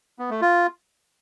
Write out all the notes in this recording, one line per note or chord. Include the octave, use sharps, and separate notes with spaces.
B3
A3
F4